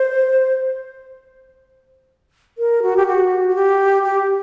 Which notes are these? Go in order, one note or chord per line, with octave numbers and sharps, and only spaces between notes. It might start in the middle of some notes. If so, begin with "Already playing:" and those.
Already playing: C5
A#4
F#4
G4
F#4
F#4
G4
G4